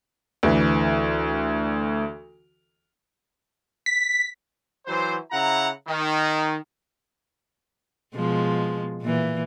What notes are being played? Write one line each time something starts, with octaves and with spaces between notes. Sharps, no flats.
D2 E3
B6
E3 F#3 C5
C#3 E4 F#5 A#5
D#3
B2 F3 G#3
A#2 E3